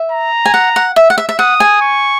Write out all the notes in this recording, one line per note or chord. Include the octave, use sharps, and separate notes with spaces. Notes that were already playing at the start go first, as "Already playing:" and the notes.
Already playing: E5
A#5
G#5
F#5
F#5
E5
F#5
E5
E5
F#5 D#6
G#5
C#6